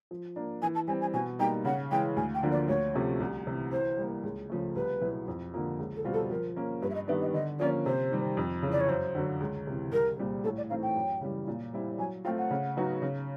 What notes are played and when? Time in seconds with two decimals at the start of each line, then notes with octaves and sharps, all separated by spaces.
0.11 F3
0.36 A#3 D4
0.62 E3 G#5
0.75 A5
0.88 G3 C4 G#5
1.01 G#5
1.14 B2 G#5
1.39 G3 A#3 D#4 G5
1.65 C#3 F#5
1.91 E3 G#3 G5
2.17 D2 G#5
2.35 G5
2.43 D3 F3 A#3 D4
2.52 D5
2.69 D2 C#5
2.94 C3 F3 A3 C#4
3.20 C2
3.47 C3 E3
3.72 E3 C5
3.98 G3 A#3
4.24 C#2
4.50 C#3 F3 A3
4.76 C2 B4
5.01 B2 F#3 B3 E4
5.28 F2
5.54 D3 F3 A#3
5.79 C#2
5.96 A4
6.04 B2 G3 C4 F4
6.14 A4
6.30 F3 A#4
6.56 A#3 C#4
6.82 G2 B4
6.90 E5
6.95 D#5
7.07 D#3 G3 B3 D4 E5
7.21 D#5
7.34 D3 D#5
7.59 F3 A#3 C#4 D5
7.86 C3 C5
8.12 D#3 G3 C4
8.37 F2
8.63 C#3 E3
8.72 D5
8.80 C#5
8.88 F#2 C5
9.15 D3 F#3
9.40 C#2
9.67 C3 E3
9.92 C2 A#4
10.18 A#2 G3 C4
10.44 A2 A4
10.57 D5
10.70 E3 A3 C4 D#4 F5
10.82 G5
10.96 F#2
11.21 C#3 E3 G3
11.48 A#2
11.73 G3 C4 E4
11.98 F#3 G#5
12.25 A3 C4 F4 G5
12.38 F#5
12.51 C#3
12.77 F#3 B3 D#4 F#4
13.02 C#3